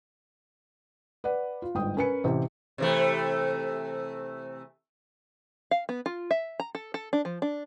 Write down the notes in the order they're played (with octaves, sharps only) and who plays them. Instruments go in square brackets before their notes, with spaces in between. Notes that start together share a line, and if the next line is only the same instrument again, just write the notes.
[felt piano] B4 D5 F#5
F4
G1 G#2 G5 D#6
C#4 A#4 B4 G#5 C#7
A1 C3 G4
[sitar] C3 E3 A3
[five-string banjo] F5
B3
F4
E5
A#5
A4
A4
D4
F3
D4